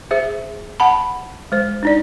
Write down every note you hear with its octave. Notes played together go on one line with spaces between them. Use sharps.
G#4 C5 E5
F#5 A5 B5
G#3 C5
D4 D#4 D5